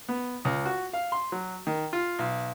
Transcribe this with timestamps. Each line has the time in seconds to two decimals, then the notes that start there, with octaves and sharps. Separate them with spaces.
0.09 B3
0.45 C#2
0.65 F#4
0.93 F5
1.12 C6
1.32 F#3
1.67 D#3
1.93 F4
2.19 B1